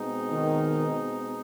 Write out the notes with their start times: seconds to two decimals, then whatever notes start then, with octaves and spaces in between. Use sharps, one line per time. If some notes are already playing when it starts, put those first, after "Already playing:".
Already playing: B2 G#3 C4 D#4
0.30 D#3